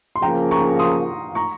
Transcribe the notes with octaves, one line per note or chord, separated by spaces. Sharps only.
C6
C#3 F3 A#3 G5 A#5
A#5 C#6
C6 D#6
A#5 C#6